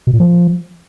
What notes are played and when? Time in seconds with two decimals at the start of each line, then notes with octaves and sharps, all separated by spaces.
0.07 B2
0.13 A#2
0.20 F3